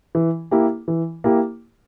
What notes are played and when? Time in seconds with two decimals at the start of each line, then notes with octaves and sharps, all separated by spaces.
0.15 E3
0.51 A#3 E4 G4
0.88 E3
1.24 A#3 E4 G4